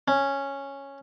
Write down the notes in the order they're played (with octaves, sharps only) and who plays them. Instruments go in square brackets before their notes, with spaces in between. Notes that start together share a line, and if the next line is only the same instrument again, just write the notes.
[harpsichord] C#4